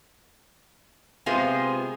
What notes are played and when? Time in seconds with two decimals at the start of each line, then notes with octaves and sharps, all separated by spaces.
1.26 C3 G#3 B3 F4 G#4 C5